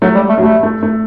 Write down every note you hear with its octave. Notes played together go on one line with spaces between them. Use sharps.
F#3 A3
G3
A3
F#3
G3 A3
A3
A3